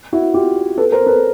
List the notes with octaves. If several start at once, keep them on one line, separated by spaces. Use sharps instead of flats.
E4 F#4
F4 G4
A4 B4
A#4 C5
A4 B4